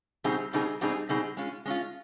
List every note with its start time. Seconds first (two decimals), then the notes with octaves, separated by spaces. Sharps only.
0.24 B2 G3 C4 D#4 G#4
0.53 B2 G3 C4 D#4 G#4
0.81 B2 G3 C4 D#4 G#4
1.09 B2 G3 C4 D#4 G#4
1.37 G#3 C#4 F4
1.65 G#3 C#4 F4